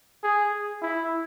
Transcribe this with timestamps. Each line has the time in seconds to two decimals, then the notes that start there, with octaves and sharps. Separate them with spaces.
0.23 G#4
0.82 E4